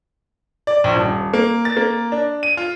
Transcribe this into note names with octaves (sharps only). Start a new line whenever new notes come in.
D5
A#1
D#1
A#3
A6
A#3
D4
D#7
F4